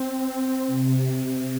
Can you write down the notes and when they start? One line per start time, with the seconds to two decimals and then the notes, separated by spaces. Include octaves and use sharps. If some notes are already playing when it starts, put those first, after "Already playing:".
Already playing: C4
0.67 C3
1.21 C3